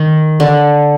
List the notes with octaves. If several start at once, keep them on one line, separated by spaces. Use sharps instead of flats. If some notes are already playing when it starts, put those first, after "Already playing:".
Already playing: D#3
D3